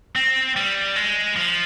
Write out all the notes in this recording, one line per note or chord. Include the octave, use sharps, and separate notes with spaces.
C4
G3
G#3
F3